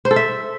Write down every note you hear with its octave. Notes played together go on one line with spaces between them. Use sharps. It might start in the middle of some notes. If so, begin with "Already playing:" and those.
C5
A4
E5